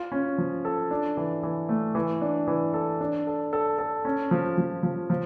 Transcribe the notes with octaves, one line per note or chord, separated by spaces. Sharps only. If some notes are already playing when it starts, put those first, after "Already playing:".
Already playing: F4
C#4
F3
A4
D4
E3
E3
A3
E3
D4
E3
A4
D4
A4
A4
A4
C#4
F3
F3
F3
F3